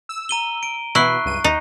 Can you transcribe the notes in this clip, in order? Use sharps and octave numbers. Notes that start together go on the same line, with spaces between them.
E6
A#5 D#7 G7
D7
B2 E3 B3 E4 C#6 F#6 C7
C#2 G2 D#7
D#2 D#4